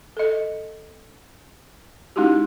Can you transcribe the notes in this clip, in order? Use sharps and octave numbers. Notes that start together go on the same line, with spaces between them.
A4 D#5
G#3 C#4 D#4 E4 F#4 G4